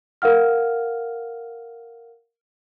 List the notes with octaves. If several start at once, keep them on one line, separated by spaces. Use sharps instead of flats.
A#4 F5 F#5 F6